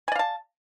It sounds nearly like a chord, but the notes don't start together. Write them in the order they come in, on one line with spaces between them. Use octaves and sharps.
G#5 D5 F5 A5